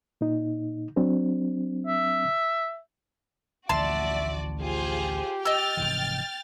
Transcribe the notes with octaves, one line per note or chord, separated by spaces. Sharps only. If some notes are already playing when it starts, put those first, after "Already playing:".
A#2 D#4
F#3 C4 D4
E5
A1 D2 F3 F#4 D5 E5 A5 C6
F4 G4 G#4 C5
D#5 G5 E6 F6 A6
F1 G#2 E3